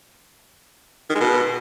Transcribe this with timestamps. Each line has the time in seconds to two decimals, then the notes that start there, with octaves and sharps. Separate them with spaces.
1.10 D#3
1.15 G#3
1.20 B2